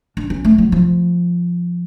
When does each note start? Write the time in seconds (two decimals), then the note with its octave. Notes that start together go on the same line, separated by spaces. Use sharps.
0.17 D4
0.30 C#4
0.44 A3
0.58 F#3
0.72 F3